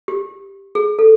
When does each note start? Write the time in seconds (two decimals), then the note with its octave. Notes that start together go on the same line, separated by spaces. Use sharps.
0.08 G4
0.75 G#4
0.99 A4